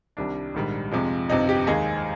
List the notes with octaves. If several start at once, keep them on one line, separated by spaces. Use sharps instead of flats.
C2 C3 D#3 G3 D4
A#1 G#2 D#3 G3
F2 C3 F3 G#3
G1 F2 C3 D#4
G4
D#2 D#3 G#3 G#4